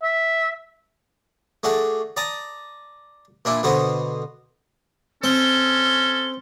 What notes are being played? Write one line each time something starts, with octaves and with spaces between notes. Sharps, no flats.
E5
A3 D4 F#4 G#4
D5 A5 A#5 D#6
A#2 D4 E4
B2 D3 B3 F#4 C5
C4 C#4 A4 G7